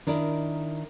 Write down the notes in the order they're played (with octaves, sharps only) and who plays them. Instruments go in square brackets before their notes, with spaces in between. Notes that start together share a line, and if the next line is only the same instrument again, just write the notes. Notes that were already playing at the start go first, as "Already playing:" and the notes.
[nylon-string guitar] D#3 D4 E4 A#4